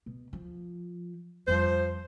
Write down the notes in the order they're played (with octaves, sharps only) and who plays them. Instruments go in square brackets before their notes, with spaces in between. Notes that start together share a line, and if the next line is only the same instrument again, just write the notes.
[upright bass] B2
F3
[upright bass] F2 G3 [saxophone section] F3 C5